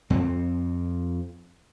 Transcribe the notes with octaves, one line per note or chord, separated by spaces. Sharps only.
F2 C4